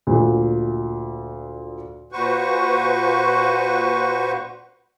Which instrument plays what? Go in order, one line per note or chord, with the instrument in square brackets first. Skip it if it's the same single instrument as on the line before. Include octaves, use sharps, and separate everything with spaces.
[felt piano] D2 A#2
[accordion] A#2 F#4 B4 C5 C#6